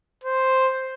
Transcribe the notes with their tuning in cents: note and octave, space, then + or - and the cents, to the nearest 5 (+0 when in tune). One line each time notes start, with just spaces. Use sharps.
C5 +0